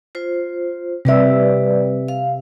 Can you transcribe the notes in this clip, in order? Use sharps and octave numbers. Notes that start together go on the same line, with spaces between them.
F4 C5
C3 G3 B4 D5 E5
F5